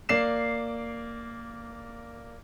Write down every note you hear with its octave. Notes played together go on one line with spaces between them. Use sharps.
A#3 D5 C7 E7